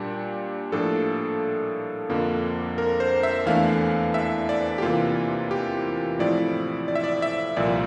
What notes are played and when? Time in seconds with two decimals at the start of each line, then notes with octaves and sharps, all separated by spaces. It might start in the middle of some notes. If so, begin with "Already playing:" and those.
Already playing: A#2 G3 D4 G4
0.72 A2 F3 A#3 D4 A4
2.10 F2 D3 F3 A#3
2.78 A#4
3.00 C5
3.23 E5
3.46 E2 E3 A3 D4 F5
4.14 E5
4.49 D5
4.78 G4
4.82 C3 E3 A#3 F4
5.51 G4
6.19 A2 F3 C4 E4 D5
6.88 D5
6.95 E5
7.04 D5
7.22 E5
7.56 C2 A#2 F3 D5